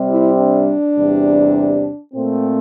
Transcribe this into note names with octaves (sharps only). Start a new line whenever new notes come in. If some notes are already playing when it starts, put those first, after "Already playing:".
Already playing: C3 G3 C4
E4
D4
E2 C3 G3
A#2 A3 C4